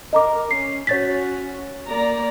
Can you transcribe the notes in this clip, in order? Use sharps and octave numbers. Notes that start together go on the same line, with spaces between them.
A#4 D#5 A#5 D6
C#4 C7
C#4 F#4 C#5 A6 B6
A#3 D5 A#5